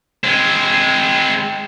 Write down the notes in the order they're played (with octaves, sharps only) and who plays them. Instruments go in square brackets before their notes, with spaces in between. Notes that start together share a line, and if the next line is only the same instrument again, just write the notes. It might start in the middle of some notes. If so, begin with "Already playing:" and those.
[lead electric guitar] G#3 C4